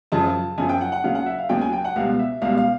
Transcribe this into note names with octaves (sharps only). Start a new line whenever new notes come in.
F#2 C#3 F3 A5
F#2 C#3 F3 G#5
G5
F#5
F#5
D#2 C#3 F#3 F5
F#5
E5
F5
D#2 C#3 F#3 G5
G#5
G5
F#5
C#2 B2 G3 F5
E5
C#2 B2 G3 F5
F5